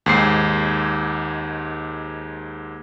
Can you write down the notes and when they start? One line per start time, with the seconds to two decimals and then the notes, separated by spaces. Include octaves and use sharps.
0.06 D#2 G#2 C7